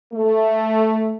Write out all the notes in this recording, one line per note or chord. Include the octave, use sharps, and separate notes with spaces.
A3